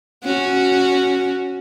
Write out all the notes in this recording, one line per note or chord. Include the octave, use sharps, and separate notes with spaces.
C#4 F#4